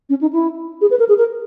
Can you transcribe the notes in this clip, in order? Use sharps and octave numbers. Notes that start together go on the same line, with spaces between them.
C#4
D#4
E4
G#4
B4
A#4
G#4
A#4